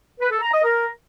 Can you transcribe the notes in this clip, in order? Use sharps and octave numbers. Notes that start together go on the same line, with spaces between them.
B4
A4
A#5
D#5
A#4